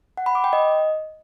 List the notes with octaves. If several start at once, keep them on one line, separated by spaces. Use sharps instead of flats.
F#5
B5
D6
G5
D#5